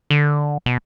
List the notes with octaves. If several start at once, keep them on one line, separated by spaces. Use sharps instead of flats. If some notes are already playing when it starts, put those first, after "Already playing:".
D3
B2